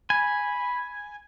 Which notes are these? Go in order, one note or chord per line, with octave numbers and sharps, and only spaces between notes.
G#5 B5